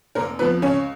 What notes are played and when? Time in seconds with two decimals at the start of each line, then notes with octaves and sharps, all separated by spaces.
0.15 F1 A#3 A#4
0.39 F2 F3 B3 B4
0.62 C#2 C#4 C#5